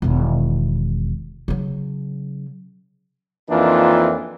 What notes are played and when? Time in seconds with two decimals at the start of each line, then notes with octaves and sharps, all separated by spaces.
0.02 E1 D#3
1.48 C#3 F#3
3.49 F2 E3 A#3 D4 D#4 F4